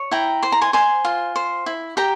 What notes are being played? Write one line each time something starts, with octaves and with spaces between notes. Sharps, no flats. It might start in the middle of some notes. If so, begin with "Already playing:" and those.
Already playing: C#5
E4 G5 A#5
C5 C6
A#5
G#5 C6
C5 G#5 C6
F4
C5
E4
G4 G5 A#5